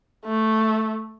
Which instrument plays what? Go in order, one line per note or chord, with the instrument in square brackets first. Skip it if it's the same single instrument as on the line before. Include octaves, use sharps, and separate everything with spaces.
[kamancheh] A3